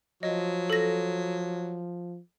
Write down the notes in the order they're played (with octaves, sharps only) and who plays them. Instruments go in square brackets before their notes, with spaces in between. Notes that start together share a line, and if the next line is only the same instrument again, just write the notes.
[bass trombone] F3 [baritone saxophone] F#3 [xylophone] D#5
[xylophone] A4 A#6